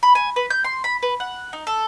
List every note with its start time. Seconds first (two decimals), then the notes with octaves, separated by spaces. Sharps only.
0.03 B5
0.15 G#5
0.36 B4
0.50 G6
0.64 C6
0.84 B5
1.03 B4
1.20 F#5
1.53 D#4
1.67 A4